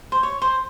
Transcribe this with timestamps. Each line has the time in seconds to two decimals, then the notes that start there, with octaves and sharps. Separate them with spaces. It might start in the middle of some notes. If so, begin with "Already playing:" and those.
0.12 C5
0.23 C#5
0.42 C5